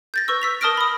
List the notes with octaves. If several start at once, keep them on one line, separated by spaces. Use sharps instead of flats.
G6 A6 A#6
B4 C#6 E6
E6 B6 F7
A#4 A5 D#6 F6 A#6 D7
B5 D#6